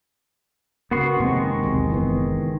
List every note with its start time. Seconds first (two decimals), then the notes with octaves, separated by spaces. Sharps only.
0.91 C#3 A#3 B3 F#4 C6
1.20 F2 C3 D#3 G#3 C#6
1.63 B1 E2 C3
1.90 F#1 E3 B3